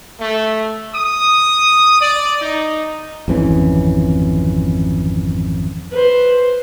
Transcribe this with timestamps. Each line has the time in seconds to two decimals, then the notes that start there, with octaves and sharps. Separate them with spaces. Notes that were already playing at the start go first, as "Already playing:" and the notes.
0.20 A3
0.95 D#6
2.01 D5
2.42 D#4
3.28 G#1 F2 E3 C#4
5.91 B4 C5